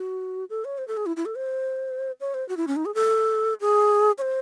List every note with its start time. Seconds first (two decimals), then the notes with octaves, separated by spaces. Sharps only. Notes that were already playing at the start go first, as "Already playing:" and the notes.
Already playing: F#4
0.50 A4
0.65 C#5
0.78 C5
0.88 A4
0.97 G#4
1.06 E4
1.17 E4
1.26 A4
1.35 C5
2.20 C#5
2.34 C5
2.49 F#4
2.57 E4
2.68 C#4
2.76 D#4
2.85 G#4
2.95 A4
3.61 G#4
4.18 C#5
4.22 C5